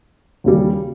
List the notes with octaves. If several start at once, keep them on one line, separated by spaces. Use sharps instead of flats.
D#2 C#3 G3